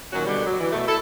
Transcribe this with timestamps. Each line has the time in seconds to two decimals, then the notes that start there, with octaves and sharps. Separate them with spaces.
0.13 A#2 D#3 F#3 C#4 F#4
0.26 B2 D3 G3
0.46 F#3
0.60 E3
0.72 B2 A3
0.87 E4 A4